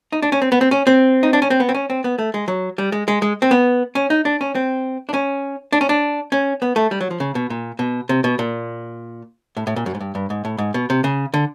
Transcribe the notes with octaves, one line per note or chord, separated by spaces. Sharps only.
D#4
D4
C#4
C4
B3
C4
C#4
C4
D#4
D4
C#4
C4
B3
C4
C#4
C4
B3
A3
G#3
F#3
G3
G#3
G#3
G#3
C4
B3
C#4
D#4
D4
C#4
C4
D4
C#4
D4
C#4
D4
C#4
B3
A3
G3
F#3
F3
C#3
B2
A#2
B2
C3
B2
A#2
A2
A2
A#2
F#2
G#2
G2
G2
G#2
A2
G#2
B2
C3
C#3
D3